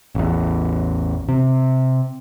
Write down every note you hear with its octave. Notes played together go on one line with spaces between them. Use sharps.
A1 E2
C3